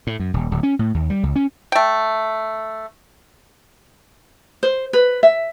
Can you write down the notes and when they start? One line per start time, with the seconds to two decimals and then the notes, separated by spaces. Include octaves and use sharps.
0.07 A2
0.20 F#2
0.34 D#1
0.51 D1
0.63 C#4
0.79 A2
0.94 D#2
1.10 G3
1.23 C#2
1.36 C#4
1.72 A3 G5
4.63 C5
4.93 B4
5.23 E5